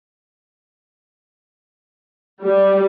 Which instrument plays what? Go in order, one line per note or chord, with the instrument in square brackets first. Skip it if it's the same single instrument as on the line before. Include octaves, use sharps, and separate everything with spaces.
[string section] G3